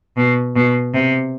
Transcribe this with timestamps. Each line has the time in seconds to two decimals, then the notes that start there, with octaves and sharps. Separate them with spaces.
0.17 B2
0.55 B2
0.94 C3